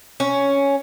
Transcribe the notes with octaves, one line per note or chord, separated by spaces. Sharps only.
C#4